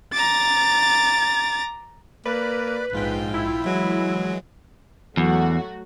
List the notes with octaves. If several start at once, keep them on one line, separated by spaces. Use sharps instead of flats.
A#5 D6 A6
A#3 B4 D5
A#1 G#2 F4 G5
E4
E3 F#3 G#3
E2 F#3 A3 F#4